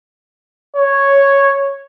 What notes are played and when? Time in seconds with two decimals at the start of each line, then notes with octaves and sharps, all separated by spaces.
0.76 C#5